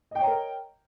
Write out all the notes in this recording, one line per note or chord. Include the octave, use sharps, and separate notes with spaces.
A#4 C#5 D#5 G5 A#5